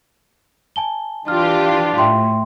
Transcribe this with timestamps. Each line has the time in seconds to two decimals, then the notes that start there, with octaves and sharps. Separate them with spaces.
0.76 G#5 A5 G7
1.28 E3 D4 F4 G4 F6
1.98 A2 E5 G5 C6